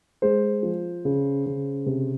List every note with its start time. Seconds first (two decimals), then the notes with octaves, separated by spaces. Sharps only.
0.22 G#3 C5
0.63 F3
1.05 C#3
1.46 C#3
1.86 C3